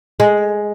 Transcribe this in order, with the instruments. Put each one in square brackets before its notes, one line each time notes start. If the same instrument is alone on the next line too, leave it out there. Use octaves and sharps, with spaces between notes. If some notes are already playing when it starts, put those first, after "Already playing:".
[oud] G#3